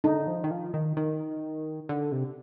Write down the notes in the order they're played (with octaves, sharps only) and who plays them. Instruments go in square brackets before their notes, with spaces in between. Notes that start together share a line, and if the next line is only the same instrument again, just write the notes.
[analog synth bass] D3 [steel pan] D#4
[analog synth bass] F3
D#3
F3
D#3
D#3
D3
C3